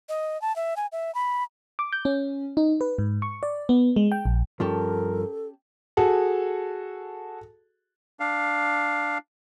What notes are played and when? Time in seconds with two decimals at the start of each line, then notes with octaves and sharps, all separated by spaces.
0.09 D#5
0.42 A5
0.56 E5
0.77 G#5
0.92 E5
1.15 B5
1.79 D6
1.93 G6
2.05 C#4
2.57 D#4
2.81 B4
2.98 G#2
3.22 C#6
3.43 D5
3.69 B3
3.96 G#3
4.12 G5
4.25 A#1
4.60 G2 F3 C#4 G4 A4 A#4 A5
5.97 F#4 G#4 A4
8.20 D4 F5